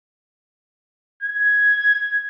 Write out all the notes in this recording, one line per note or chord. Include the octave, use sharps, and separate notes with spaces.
G#6